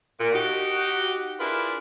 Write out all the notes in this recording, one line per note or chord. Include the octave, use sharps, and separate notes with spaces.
A#2
D#4 F#4 G4
D4 E4 F4 G#4 A#4 B4